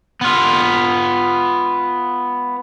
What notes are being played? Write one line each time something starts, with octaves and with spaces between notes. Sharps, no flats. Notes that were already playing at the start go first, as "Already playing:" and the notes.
B3 F4